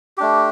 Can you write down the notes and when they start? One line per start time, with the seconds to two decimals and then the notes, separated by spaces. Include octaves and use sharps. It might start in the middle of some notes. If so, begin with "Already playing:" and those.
0.18 A3 D4 G4